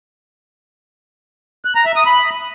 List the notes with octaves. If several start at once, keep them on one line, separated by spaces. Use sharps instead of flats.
F#6
A#5
E5
D#6
B5